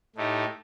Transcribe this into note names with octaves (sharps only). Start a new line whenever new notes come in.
A2 A3 D#4 G4